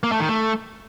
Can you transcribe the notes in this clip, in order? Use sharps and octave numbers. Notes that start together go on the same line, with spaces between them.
A#3
A3
D#3
A3